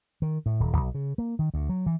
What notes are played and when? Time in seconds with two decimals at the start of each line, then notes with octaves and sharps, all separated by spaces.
0.22 D#3
0.46 A2
0.60 D#1
0.77 B1
0.95 C#3
1.18 A#3
1.39 D#3
1.54 D2
1.69 F#3
1.86 E3